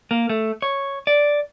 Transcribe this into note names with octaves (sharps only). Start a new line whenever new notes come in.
A#3
A3
C#5
D5